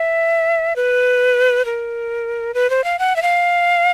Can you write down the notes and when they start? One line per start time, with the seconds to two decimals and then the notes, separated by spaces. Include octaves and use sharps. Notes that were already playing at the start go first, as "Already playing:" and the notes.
Already playing: E5
0.76 B4
1.65 A#4
2.54 B4
2.70 C5
2.84 F5
2.99 F#5
3.16 E5
3.22 F5